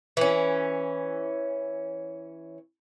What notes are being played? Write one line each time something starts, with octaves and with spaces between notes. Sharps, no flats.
E3 C#4